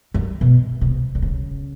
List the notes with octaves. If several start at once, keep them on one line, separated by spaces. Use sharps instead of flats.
F#2
B2
C3
D3
C#3